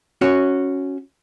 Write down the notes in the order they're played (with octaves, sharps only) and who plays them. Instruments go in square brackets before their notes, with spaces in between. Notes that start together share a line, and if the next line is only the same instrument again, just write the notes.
[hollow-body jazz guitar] C#4 F#4 C#5